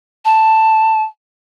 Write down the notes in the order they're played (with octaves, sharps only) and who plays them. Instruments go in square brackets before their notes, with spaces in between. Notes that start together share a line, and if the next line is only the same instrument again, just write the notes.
[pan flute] A5